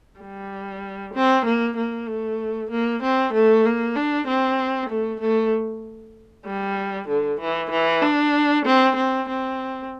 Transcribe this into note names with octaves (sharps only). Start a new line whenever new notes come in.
G3
C4
A#3
A#3
A3
A#3
C4
A3
A#3
D4
C4
A3
A3
G3
D3
E3
E3
D4
C4
C4
C4